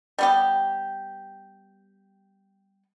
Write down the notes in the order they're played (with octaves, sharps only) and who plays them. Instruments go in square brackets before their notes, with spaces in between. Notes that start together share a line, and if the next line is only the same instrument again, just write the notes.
[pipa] G3 B3 G4